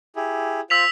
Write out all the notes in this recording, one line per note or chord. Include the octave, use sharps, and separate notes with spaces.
E4 G4 G#4
F4 C5 E6 B6 F7